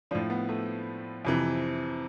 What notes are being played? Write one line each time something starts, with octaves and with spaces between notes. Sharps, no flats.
A2 F3 D4
B3
A3
F2 C3 E3